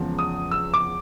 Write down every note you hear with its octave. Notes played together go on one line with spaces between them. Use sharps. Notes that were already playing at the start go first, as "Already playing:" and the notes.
Already playing: E2 C#3 F3 G#3
D#6
E6
D6